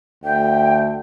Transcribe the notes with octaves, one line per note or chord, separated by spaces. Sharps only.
D2 G5